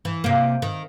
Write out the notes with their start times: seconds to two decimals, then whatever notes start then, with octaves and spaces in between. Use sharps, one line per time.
0.05 E3
0.24 C3 A#3
0.62 D#3